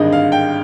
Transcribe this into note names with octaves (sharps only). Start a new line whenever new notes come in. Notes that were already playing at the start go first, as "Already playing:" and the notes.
Already playing: G#1 G2 D3 G#3 D#5
F5
G5